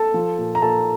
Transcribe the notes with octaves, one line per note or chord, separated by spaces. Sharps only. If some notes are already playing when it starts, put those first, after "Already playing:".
Already playing: A4 A5
F3
A#2
A#5
A#2 A4 A5